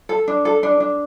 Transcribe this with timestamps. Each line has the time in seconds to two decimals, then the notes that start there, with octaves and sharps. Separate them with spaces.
0.09 A4
0.28 D4
0.45 A4
0.63 D4
0.80 D4